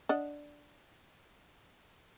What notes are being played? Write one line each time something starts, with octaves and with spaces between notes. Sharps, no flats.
D4 D#5 F#5